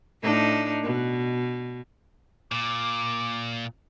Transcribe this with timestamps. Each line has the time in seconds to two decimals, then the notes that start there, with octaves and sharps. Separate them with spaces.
0.21 A2 D4 D#4
0.83 B2
2.52 A#2 D6